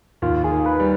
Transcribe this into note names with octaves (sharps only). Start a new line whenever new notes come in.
D#2 F4
G#4
D#3
B4
G3